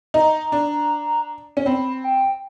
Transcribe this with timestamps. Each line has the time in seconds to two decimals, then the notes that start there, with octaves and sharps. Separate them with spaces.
0.14 D#4 A#5
0.52 D4
1.57 C#4
1.66 C4 B5
2.04 G5